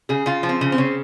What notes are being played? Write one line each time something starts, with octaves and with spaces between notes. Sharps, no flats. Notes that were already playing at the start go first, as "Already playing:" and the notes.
C#3 G#4
C#3 F4
F3
C4
C#3
C4
C#3